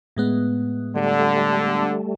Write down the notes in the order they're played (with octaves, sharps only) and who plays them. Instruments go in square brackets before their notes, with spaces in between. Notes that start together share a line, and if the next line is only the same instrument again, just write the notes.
[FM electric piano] A2 G#3 B3
[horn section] D3 [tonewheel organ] G3 A3